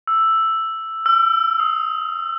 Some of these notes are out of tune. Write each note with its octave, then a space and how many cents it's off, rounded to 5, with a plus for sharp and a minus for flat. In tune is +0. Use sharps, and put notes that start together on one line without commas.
E6 +5
E6 +40
D#6 +25